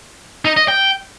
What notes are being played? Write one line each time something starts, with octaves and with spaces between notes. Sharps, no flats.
D#4
D#5
G5